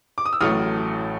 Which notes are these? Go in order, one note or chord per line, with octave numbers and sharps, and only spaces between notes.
D6
D#6
E6
A1 A2 F#3 A3 D#6 F6